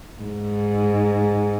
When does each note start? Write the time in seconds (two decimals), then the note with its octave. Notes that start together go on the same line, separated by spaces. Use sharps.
0.23 G#2